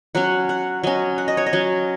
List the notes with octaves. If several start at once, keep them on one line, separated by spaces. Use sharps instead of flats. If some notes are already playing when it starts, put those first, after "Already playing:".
F#3 C#4 F#5
F#5
F#3 C#4 D#5
F#5
D#5
C#5
D#5
F#3 C#4